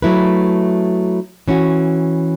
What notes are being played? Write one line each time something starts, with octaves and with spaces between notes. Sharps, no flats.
F#3 A3 E4 B4
E3 C#4 F#4